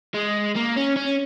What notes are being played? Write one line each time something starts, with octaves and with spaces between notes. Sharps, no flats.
G#3
A#3
C#4
C#4